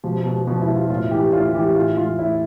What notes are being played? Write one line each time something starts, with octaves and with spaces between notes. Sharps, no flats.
B2 F3
B2
B2 F3
E4
B2
F4
A2 F4
E3 G4
A2 F4
E3 G4
A2 F4
E3 F4
A2 E4